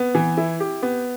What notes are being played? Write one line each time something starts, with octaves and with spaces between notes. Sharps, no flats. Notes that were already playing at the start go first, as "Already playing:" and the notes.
Already playing: B3
E3
E4
G4
B3